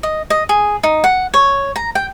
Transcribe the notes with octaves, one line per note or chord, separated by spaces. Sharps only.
D#5
D#5
G#4
D#4
F#5
C#5
A#5
G5